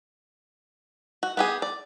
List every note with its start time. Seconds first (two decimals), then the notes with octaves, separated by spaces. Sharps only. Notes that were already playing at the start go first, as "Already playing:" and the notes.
1.23 F#4
1.37 B3 G4 G#4
1.62 D5